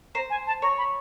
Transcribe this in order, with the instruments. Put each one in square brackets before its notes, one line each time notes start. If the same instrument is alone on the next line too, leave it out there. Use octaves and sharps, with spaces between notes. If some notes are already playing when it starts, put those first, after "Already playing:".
[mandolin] C5 [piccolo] A#5
[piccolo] G#5
A5
[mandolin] C#5 [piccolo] A#5
[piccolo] B5